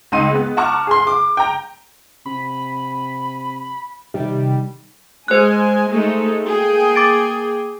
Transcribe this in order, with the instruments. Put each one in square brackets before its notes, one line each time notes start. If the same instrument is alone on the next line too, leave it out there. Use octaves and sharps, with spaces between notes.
[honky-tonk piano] C#2 D#4 C6 D#7
G#3 B3
F#5 A5 A#5 C#6 D6 F6
G#4 C6
D6
G5 A#5
[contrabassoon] C3 [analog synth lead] B5
[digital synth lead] C3 [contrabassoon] D#3 [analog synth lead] G3
[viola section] G#3 G#5 [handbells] C5 F#6
[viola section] G#3 A3 D#4
A#3 G#4 G5
[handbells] D6 A6 D7